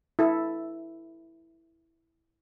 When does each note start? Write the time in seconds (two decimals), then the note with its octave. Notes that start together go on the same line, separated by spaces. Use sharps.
0.19 E4 A4